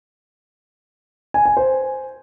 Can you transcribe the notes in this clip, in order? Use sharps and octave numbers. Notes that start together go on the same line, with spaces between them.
G#5
G#5
C5